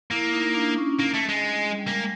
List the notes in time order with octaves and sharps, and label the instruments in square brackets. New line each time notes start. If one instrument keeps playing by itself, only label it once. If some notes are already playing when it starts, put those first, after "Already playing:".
[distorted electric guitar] A#3 [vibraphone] E4
[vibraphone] D#4
D4
C#4
[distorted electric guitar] A#3
A3
G#3
[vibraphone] G3
[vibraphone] G#3 [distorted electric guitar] A#3